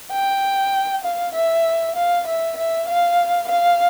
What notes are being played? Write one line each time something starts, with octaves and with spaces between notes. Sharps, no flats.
G5
F5
E5
F5
E5
E5
F5
F5